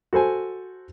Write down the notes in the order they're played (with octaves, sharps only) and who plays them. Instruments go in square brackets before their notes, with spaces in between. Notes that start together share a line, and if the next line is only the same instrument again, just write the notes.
[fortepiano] F#4 A4 C5 G#5